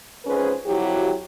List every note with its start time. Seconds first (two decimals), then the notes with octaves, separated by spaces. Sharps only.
0.25 F2 G#2 C#4 G#4 B4 C5
0.65 F2 F#3 E4 F#4 G4